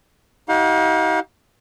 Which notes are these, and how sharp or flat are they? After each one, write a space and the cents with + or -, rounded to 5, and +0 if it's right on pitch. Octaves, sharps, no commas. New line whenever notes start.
D#4 +40 G4 -40 F5 +40